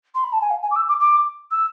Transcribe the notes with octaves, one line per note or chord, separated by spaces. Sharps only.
C6
B5
A5
G#5
F5
G#5
D6
E6
D6
D6
E6